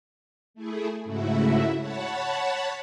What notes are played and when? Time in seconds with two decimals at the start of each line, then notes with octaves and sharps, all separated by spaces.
0.54 A3 E4 G#4
1.04 G#2 C#3 A3 E4 F#4 E5
1.77 C#5 F#5 A5 B5